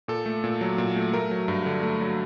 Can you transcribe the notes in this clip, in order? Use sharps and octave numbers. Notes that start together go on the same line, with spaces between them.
A#2 A4
A3
A#2
F#3
A#2
A3
A3 A#4
F#3
G2
D3
A3
F#3